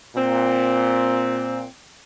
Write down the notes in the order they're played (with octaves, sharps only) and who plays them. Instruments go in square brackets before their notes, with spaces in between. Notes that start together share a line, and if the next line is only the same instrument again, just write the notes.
[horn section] A#2 C4